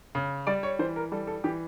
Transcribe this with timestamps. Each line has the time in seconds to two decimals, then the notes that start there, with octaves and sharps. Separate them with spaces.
0.15 C#3
0.47 G3 D5
0.63 C#5
0.79 E3 C5
0.96 A#4
1.12 G3 A4
1.27 A4
1.44 E3 G4